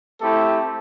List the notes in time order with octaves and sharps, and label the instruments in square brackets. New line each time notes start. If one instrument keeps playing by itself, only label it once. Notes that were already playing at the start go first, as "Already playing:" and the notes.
[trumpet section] A3 C4 E4 G4 A4